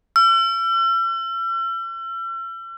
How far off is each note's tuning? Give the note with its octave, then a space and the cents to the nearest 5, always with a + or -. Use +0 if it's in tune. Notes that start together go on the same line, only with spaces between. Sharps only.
E6 +45